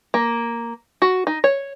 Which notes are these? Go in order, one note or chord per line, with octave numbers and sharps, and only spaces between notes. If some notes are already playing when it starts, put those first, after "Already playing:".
A#3
F#4
D#4
C#5